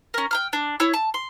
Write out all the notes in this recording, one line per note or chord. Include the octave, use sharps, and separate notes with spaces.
C#4 A#4
G5 A#5 F6
D4
E4 C#5
A5
C6